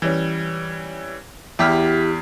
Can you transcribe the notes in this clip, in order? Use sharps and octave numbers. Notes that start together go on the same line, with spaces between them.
E3 G3 C#4
E2 E4 G4 F6 B6